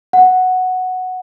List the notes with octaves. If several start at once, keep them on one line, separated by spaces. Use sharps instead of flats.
F#5